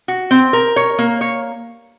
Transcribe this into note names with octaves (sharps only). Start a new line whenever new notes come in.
F#4
C4
A#4
C#5
A#3
C#5